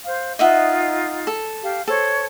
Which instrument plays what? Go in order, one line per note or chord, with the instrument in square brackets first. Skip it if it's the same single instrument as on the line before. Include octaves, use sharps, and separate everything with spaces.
[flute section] C5 F5
[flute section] D#4 F4 [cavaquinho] D#5 E5 F#5
[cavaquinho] A4
[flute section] G4 F5
[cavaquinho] A4 [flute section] C5 C#5